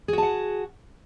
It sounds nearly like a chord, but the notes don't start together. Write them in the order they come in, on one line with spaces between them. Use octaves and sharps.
G#4 F#4 A5 F#5